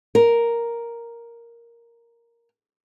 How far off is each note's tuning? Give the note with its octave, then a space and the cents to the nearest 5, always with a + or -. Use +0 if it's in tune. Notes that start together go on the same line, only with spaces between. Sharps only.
A#4 +0